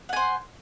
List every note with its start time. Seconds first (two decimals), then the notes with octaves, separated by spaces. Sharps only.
0.09 F#5
0.13 G#5
0.16 C5